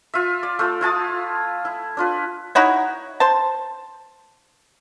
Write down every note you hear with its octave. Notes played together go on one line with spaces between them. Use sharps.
F4 E5
D5
A3 F4 E6
E4 F4 A5 D#6
E4
D4 F4 B4
D#4 E4 F#4 C#5
C5 A5